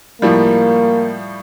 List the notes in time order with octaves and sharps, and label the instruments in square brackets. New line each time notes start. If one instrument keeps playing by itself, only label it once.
[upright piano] A2 F3 G3 [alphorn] A#3